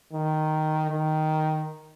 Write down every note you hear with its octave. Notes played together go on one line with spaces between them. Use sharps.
D#3
D#3